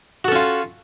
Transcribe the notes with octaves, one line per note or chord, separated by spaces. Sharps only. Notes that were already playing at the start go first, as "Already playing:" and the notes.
C#4 F4 F#4 A4